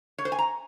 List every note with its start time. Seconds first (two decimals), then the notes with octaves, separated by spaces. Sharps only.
0.18 C#5
0.25 C5
0.32 G#5
0.39 A#5